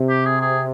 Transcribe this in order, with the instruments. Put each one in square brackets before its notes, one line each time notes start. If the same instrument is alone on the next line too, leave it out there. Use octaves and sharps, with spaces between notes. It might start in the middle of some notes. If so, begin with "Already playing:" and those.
Already playing: [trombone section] C3
[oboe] G4
G#4
G#4